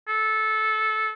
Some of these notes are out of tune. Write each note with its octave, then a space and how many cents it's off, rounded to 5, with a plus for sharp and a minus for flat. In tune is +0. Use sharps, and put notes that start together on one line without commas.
A4 -15